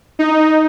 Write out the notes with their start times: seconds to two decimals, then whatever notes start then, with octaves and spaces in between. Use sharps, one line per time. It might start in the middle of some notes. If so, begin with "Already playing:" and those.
0.19 D#4